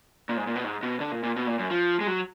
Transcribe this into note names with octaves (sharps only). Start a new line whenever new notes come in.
A#2
G#2
A#2
B2
G#2
B2
D3
A#2
A#2
B2
A#2
F#2
F3
G#3
F#3